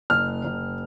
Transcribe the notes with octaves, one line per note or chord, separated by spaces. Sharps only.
F#1 F6
F#1